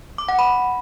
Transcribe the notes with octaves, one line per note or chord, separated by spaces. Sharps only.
D6
F#5
B5